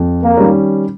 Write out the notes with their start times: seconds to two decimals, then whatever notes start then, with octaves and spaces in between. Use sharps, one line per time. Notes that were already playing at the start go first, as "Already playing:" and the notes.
Already playing: F2
0.23 A#3
0.37 D#3 G3 C#4